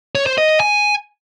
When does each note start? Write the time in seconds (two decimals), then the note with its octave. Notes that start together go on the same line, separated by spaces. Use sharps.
0.15 C#5
0.27 C5
0.38 D#5
0.49 D#5
0.60 G#5